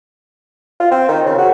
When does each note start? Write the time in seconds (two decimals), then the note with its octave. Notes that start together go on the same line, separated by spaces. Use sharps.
0.80 F4
0.91 C4
1.09 D#3
1.26 C#3
1.38 F#4